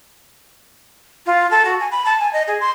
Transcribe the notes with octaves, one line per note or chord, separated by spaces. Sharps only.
F4
A4
F#4
G#5
B5
A5
G#5
D#5
G#4
C6